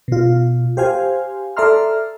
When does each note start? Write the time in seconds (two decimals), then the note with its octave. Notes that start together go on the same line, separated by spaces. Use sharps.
0.08 B2 F4
0.77 G4 C5 F5 G#5
1.57 A4 D5 E5 A#5 C6 F6